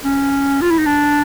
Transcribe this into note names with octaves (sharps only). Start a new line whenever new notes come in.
C#4
F4
E4
D#4
D4